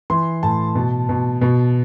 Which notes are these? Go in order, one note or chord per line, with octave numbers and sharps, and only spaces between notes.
E3 C6
A2 A5
B2
B2
B2